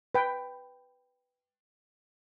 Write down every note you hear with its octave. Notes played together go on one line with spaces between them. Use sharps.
B4 G5